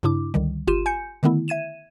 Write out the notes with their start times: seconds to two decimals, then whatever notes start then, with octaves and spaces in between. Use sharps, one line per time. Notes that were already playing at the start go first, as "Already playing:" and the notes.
0.03 G2 C#3 D4 E4 D6
0.34 C#2 D3 D#3 G3
0.67 G1 F4 G4 C6 D#7 E7
0.86 G#5 G6 C#7
1.23 D3 D#3 A3 B3 E4
1.48 E5 G#6 D#7 E7